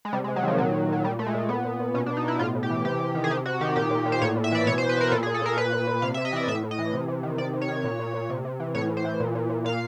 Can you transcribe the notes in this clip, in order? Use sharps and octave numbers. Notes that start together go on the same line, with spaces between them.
G#3
C3 G3
G#3
C3
F#3
D#3 F3
A#2 F#3
A#2
A#2 F#3
A#2 G3
A#2 A3
G#3
A#2
A#2 B3
A#2
A#2
B2 C#4
D4
B2
D#4
B2 E4
A2 F4
A2
G4
E3
C3 G4
C3
D#3
G#4
C3 G4
C3 F#4
D#3 G4
A#2 G4
A#2
A#2
C5
A2 C#5
A2
E5
E3 D5
B2 C#5
C5
B2
B4
B2 A#4
A#2 A4
G#4
A#2
A4
A#2 A#4
A#2 B4
A#2
A#2
C3 F5
E5
C3
D#5
E3 D5
A2 E5
A2
D#5
E3
C3
C3
D#3
C3 D5
C3
C#5
D#3
A#2
A#2
A#2
C3
C3
E3
A2 C#5
A2
C5
E3
A#2
A#2
A#2
A#2 F5